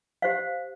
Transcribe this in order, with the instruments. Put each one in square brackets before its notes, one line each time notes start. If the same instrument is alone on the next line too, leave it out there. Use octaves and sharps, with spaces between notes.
[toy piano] G4 C5 F5